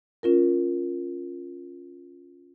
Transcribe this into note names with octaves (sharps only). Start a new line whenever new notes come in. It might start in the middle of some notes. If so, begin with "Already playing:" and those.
C#4 F4 A#4